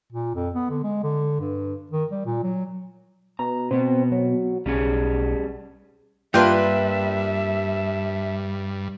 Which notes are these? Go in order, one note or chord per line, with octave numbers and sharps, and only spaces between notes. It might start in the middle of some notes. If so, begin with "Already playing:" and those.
A#2
F2
B3
D3
G#3
D3
G2
D#3
G3
A#2
F#3
B2 A#5
B2 B3 C4
F#3
B1 G3 C#4 G#4
G2 G3 A#3 D4 F4 B4 E5 G5